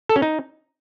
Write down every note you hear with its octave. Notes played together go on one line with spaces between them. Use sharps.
A4
C#4
D#4